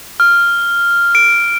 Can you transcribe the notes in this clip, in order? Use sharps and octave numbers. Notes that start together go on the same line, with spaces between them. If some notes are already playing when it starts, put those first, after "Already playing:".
F6
D7